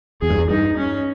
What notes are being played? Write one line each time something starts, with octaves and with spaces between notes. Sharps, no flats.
E2 G#4
G2
E2
G2 D#4
C#4